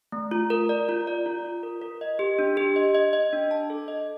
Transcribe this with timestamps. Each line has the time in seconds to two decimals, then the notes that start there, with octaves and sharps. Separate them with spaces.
0.12 A3
0.31 F4
0.50 A#4
0.69 D5
0.89 F4
1.07 D5
1.26 F4
1.45 F4
1.63 A#4
1.82 A#4
2.01 D#5
2.19 G4
2.39 D4
2.57 G4
2.76 D#5
2.95 D#5
3.13 D#5
3.33 D4
3.51 A5
3.70 A4
3.88 D#5